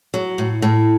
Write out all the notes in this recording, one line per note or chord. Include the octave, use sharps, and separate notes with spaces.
F#3
A2
A2